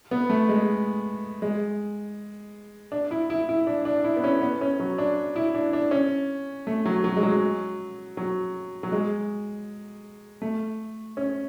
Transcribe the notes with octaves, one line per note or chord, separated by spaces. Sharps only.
B3
A3
G#3
G#3
D4
E4
E4
E4
D4
D4
E4
B3
C#4
B3
C#4
F#3
D4
E4
D4
D4
C#4
A3
F#3
F#3
G#3
F#3
F#3
F#3
G#3
A3
C#4